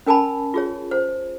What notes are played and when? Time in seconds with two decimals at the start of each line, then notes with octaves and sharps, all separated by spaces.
0.06 C#4 A#4 G#5 A5 B5
0.54 F4 G#4 C#5
0.91 C5